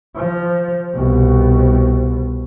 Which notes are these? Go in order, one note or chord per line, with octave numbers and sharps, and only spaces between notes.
F3
C2 B2